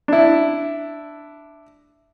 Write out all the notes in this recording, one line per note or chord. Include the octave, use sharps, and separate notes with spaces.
D4 E4